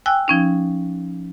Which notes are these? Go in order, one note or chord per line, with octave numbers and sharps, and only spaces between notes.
G5 G#5 E6 F#6
F3 C#4 D#4